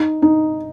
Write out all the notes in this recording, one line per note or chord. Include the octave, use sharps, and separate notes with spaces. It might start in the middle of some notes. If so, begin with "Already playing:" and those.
Already playing: D#4
D#4